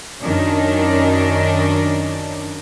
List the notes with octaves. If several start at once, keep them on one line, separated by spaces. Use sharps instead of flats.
F#2 D#3 C#4 D4